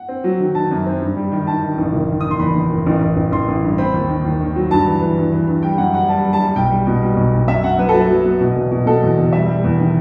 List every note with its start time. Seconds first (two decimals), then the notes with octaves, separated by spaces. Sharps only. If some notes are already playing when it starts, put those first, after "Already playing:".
Already playing: F#5
0.09 C4
0.24 F#3
0.40 D#3
0.55 D#3 A5
0.71 F#2
0.86 C4
1.02 G2
1.17 G3
1.32 D#3
1.47 D#3 A5
1.63 D#3
1.78 A1
1.93 F#1
2.09 D#3
2.21 D#3 D#6
2.31 C6
2.39 E2 B5
2.55 D#3
2.70 F#1
2.86 A1
3.01 A1
3.16 A1
3.32 A1 C6
3.48 A1
3.63 G2
3.78 C4 B5
3.94 D#2
4.09 D#3
4.25 D#2
4.41 D#3
4.56 F#3
4.71 G2 A5
4.86 E3
5.01 E3
5.18 G2
5.32 E3
5.48 G2
5.63 G3 G5
5.78 F#2 F#5
5.94 G3 F#5
6.09 G3 A5
6.25 G3
6.33 A5
6.40 G3
6.56 B1 G5
6.71 G3
6.87 B2
7.02 G3
7.16 B1
7.33 B1
7.48 F#2 E5
7.64 F#2 F#5
7.78 F#2 B4
7.89 F#3 A4
8.00 B4
8.09 F#3
8.25 B3
8.40 B2
8.55 E1
8.72 B2
8.86 B2 A4
9.02 E2
9.17 E1
9.33 G3 E5
9.48 G3
9.64 E2
9.78 D#3